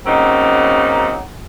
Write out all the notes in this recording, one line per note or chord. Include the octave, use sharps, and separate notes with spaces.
C#3 F#3 A#3 C4 C#4 D#4